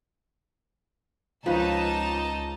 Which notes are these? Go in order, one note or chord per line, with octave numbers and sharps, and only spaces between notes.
C#2 F3 C#4 D#4 B4 A5